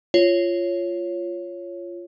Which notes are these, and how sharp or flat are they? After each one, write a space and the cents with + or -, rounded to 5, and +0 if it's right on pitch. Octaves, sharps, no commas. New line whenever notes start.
F4 -10 C#5 +0